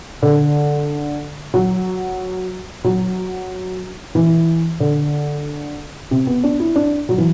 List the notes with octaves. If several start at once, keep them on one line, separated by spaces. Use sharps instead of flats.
D3
F#3
F#3
E3
D3
C3
B3
D4
E4
D4
F#3
E3